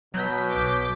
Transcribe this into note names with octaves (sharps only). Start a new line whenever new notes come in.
B2 F#3 G6 B6
B1 D6